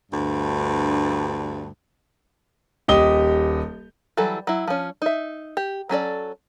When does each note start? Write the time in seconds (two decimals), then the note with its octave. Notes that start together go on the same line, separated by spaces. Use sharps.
0.12 D2 G2
2.88 D#1 G4 D#5 D#6 G7
4.17 E3 F#3 G3 A4
4.47 F#3 E4
4.67 F3 C#4
5.02 D#4 E5
5.57 G4
5.89 F#3 C#4 A4 D5